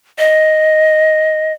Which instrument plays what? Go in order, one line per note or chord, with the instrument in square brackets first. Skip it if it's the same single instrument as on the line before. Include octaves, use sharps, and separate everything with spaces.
[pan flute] D#5